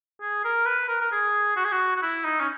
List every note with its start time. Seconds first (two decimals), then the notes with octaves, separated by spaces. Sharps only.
0.21 G#4
0.44 A#4
0.66 B4
0.88 A#4
1.01 A#4
1.12 G#4
1.57 F#4
1.65 G#4
1.72 F#4
1.96 F#4
2.02 E4
2.24 D#4
2.40 C#4